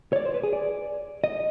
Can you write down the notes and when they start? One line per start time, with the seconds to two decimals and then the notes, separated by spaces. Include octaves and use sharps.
0.13 C#5
0.16 D5
0.25 C5
0.34 B4
0.43 G#4
0.53 D5
1.24 D#5